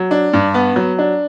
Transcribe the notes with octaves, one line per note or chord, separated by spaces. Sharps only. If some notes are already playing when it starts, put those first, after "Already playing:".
Already playing: F#3
D4
G2
B3
F#3
D4